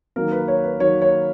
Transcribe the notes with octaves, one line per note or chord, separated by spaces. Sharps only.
D#3 F#3 A#3 A#4
B4
C#5
B4
D#3 F#3 A#3 C#5
C#5